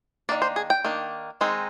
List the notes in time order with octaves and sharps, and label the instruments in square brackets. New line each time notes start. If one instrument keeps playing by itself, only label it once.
[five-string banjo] D#3 A#3 D4 D5
C5
G#4
G5
D#3 A#3 D4
D#3 G#3 C4 D#4